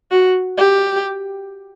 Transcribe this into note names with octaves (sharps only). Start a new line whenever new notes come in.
F#4
G4